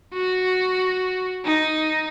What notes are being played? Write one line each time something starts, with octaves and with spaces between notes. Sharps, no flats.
F#4
D#4